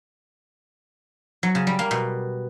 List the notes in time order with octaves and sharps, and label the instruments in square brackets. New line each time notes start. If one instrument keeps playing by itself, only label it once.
[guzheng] F#3
C#3
G3
A#3
B2